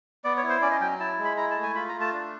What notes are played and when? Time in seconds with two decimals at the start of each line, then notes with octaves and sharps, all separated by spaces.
0.24 B3 D5
0.37 C#5
0.43 E4
0.49 C5
0.62 C#4 D5
0.71 D#5
0.80 F#3 G5
1.00 E4 A5
1.18 G#3
1.25 B5
1.37 E4 A#5
1.51 A5
1.57 A3
1.63 G#5
1.75 F4 B5
1.89 A#5
1.94 A3
2.01 A5
2.13 D4